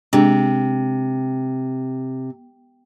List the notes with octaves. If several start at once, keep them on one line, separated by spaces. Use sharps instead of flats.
C3 G#3 D4 G#4